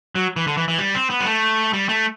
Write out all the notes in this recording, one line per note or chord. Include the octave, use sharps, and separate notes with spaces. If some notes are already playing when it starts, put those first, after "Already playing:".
F#3
E3
D3
E3
E3
G3
C4
B3
G3
A3
G3
A3